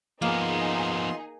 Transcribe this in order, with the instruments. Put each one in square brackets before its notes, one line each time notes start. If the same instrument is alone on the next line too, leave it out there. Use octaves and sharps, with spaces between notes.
[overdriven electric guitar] F3 B3 [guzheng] A#3 [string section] D#4 G#4 [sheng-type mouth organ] F4 D#5 C6